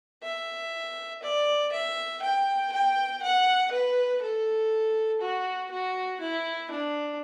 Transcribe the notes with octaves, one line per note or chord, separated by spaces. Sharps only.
E5
D5
E5
G5
G5
F#5
B4
A4
F#4
F#4
E4
D4